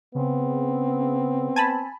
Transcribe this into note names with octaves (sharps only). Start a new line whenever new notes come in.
C#3 B3 C4
G#5 A5 B5